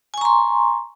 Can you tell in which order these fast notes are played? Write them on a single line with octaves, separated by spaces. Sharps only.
G#5 C#6 A#5 C6